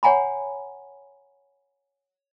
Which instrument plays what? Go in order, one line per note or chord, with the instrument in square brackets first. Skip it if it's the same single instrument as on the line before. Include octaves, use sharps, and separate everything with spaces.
[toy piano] C#5 F#5 G#5 A#5 B5